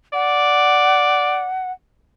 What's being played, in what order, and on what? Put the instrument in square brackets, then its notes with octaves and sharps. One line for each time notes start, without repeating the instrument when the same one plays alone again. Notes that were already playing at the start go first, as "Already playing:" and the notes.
[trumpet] D5 [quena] F#5